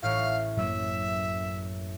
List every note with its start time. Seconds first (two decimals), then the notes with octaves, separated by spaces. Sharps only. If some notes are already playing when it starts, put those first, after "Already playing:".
0.03 A1 A2 F5
0.57 F#2 F#3 A#3 E5